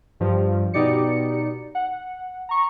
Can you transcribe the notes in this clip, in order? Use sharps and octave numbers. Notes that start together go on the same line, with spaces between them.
G2 F3
B2 D#4 G4 D5 C#7
F#5
A#5 C#6